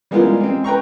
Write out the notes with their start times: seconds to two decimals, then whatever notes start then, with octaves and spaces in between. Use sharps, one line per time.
0.11 G3 G#3 B3 E4 F4 A#4
0.40 G#3 C4
0.64 B4 G5 A#5 C#6